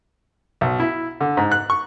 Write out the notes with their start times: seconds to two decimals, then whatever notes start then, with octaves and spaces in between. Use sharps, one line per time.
0.61 B1
0.80 E4
1.21 D3
1.37 G#2
1.52 F#6
1.70 C#6